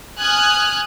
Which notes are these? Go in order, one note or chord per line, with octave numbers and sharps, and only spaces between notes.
G#5 D#6 F6 F#6 G#6